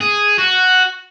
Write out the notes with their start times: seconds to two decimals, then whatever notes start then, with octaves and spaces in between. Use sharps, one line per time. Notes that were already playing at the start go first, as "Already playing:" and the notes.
0.01 G#4
0.38 F#4